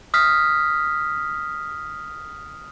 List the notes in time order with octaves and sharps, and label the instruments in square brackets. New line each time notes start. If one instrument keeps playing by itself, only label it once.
[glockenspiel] D#6 F6 B6